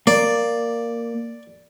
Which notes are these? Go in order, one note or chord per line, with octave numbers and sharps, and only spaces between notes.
A#3 D5